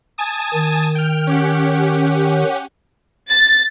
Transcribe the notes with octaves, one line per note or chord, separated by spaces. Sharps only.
G#5 A5 D#6
D#3
G5 F6
C#4 G4 F#5
A6